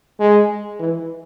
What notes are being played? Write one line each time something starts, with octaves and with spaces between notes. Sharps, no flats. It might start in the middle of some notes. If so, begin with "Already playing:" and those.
G#3
E3